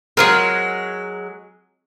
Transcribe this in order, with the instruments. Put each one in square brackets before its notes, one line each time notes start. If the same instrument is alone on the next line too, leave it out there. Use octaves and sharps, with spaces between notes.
[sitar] F#3 G#3 [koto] C4 F4 G#4 [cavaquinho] A#4